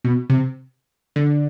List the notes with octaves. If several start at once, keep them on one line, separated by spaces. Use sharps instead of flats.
B2
C3
D3